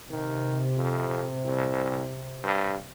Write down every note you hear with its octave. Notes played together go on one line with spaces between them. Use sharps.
C3 D#3
F2
C2
G2